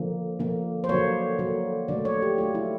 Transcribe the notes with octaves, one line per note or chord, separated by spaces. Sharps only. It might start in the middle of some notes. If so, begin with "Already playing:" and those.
Already playing: D3 F3 A#3
D3 F3 A#3
C5
D3 F#3 A#3 C#5
D3 F#3 A#3
D3 F#3 A3 D5
C#5
G4
D3 F#3 A3 F4
E4